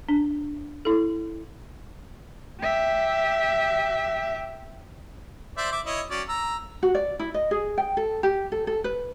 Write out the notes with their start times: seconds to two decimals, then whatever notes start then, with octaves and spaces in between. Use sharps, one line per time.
0.09 D4
0.85 E4 A4
2.61 G4 E5
5.58 C5 D5 E5
5.72 E5 D6
5.86 E4 C#5 D#5
6.10 F#3 C#4 D5
6.29 A#5 E6
6.83 F#4
6.95 D5
7.19 E4
7.34 D#5
7.51 G#4
7.78 G5
7.97 A4
8.23 G4
8.52 A4
8.67 A4
8.84 B4